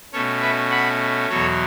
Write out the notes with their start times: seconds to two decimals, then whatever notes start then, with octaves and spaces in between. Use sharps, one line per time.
0.13 B2 A3 C#4 A4 C#5
0.42 B4 E5
0.71 F#5 B5
1.29 E2 B2 F#3 A4 C#5